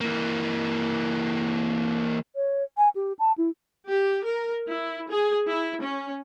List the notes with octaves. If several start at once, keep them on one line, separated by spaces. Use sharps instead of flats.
E3 A#3
C#5
G#5
G4
A5
E4
G4
A#4
E4
G#4
E4
C#4